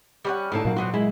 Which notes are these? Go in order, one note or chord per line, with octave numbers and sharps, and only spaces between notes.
G3 C#4 F#5
A2 D3 D#4 F5 A5
A#2 F#3 A#3 F#4
D3 B3 C4 F#4
G#3 E4